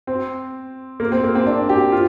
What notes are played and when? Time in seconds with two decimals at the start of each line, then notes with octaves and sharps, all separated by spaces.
0.07 C4
1.00 A#3
1.12 C4
1.24 A#3
1.35 C4
1.47 D4
1.69 G4
1.92 F4